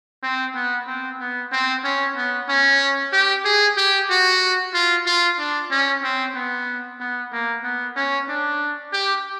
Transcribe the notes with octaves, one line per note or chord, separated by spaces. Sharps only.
C4
B3
C4
B3
C4
C#4
B3
C#4
G4
G#4
G4
F#4
F4
F4
D4
C#4
C4
B3
B3
A#3
B3
C#4
D4
G4